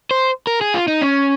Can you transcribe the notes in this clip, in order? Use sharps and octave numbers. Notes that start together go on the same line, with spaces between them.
C5
A#4
G#4
F4
D#4
C#4